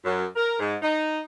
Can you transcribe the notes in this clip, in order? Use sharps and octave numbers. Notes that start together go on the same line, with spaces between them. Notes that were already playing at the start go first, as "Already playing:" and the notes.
F#2
A#4
G#2
D#4